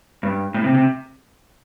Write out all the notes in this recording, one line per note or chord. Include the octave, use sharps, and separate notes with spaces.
G2
A2
C3
C3